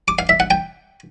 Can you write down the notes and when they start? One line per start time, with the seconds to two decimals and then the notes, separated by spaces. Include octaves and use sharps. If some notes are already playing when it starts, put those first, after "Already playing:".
0.08 D6
0.19 F5
0.29 E5
0.40 F#5
0.51 G5